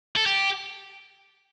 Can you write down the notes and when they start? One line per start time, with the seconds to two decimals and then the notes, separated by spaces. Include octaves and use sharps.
0.16 A4
0.26 G4